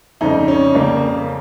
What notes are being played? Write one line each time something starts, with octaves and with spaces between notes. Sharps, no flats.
F2 C#3 G3 D#4
C#4
C#3 G3 A#3